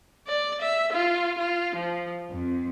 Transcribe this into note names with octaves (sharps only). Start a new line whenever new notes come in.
D5
E5
F4
F4
F3
F2